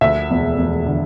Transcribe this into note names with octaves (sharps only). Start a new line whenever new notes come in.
D2 E5
E1
E1
D3